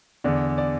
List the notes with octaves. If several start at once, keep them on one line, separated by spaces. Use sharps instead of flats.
E2 D3 D5
D5